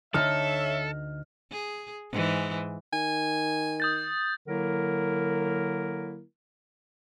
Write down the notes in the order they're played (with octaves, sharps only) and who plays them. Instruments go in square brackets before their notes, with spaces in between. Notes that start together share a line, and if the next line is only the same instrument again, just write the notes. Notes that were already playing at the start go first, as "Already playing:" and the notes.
[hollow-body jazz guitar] D2 D3 D#4 [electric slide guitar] A4 [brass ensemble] C#5 E5 [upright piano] F6
[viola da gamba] G#4
G#2 E3
[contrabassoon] D#3 [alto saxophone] G#5
[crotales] D#6 G6 A6
[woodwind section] D3 F#3 A#3 E4 A#4